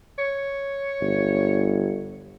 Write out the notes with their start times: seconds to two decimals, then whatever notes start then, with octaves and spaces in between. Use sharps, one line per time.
0.18 C#5
1.01 G1